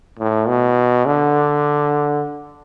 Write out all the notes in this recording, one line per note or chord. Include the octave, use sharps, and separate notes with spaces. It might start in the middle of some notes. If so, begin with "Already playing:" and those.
A2
B2
D3